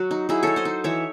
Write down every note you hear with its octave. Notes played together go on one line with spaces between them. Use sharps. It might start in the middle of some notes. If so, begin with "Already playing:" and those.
Already playing: F#3 F#4
D#4
F#3 E4 G#4
D#4 A4 C#5
C5 D#5
D#4
E3 C#5 E5